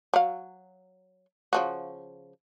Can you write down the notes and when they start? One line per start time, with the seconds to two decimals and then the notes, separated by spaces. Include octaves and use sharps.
0.14 F#3 F5
1.53 C#3 F3 F#4